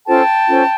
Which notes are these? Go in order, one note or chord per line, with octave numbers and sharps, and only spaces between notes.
C#4 F4 A4 C5 G5 A5
C#4 F4 A4 C5